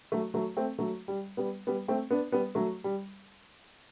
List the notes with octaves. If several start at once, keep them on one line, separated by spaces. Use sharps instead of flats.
F#3 A3
F#3 A3
A3 C4
F#3 A3
G3
G3 B3
G3 B3
A3 C4
B3 D4
G3 B3
F#3 A3
G3